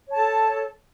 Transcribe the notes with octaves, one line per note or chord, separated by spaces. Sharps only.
A4 C#5 A5